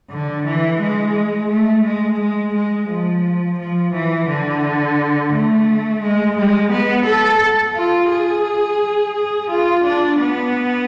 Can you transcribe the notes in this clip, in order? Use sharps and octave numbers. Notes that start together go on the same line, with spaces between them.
D3
E3
G#3
A3
G#3
G#3
G#3
F3
F3
E3
D3
A3
G#3
G#3
B3
A4
F4
G#4
G#4
F4
D4
B3